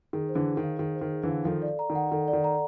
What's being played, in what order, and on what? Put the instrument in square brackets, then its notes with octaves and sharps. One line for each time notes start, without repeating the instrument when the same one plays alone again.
[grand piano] D#3 [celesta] G#4
[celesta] C5
[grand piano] D3 E3
[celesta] G#4
[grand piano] D#3
[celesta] F5
[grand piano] D#3 [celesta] G#4
[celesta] C5
[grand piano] D#3
[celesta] G#4
[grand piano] D3 E3
[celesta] F5
[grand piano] D#3 F3 [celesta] A4
[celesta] D5
A#5
[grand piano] D#3
[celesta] F#5
[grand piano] D#3 [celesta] A4
[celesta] D5
[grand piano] D#3
[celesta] A#5